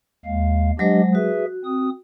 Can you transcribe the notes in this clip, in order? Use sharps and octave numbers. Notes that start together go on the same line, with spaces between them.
D#2 G#3 F5
F#3 G#3 D4 G4 C5 D#5
F#4 G#4 B4 E5
C4 D#6